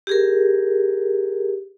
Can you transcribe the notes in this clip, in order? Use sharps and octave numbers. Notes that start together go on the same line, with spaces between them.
G4 G#4 A#4